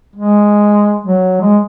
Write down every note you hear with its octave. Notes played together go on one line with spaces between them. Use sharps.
G#3
F#3
G#3